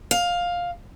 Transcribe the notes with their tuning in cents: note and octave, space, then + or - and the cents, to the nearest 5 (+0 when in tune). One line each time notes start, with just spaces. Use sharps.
F5 +10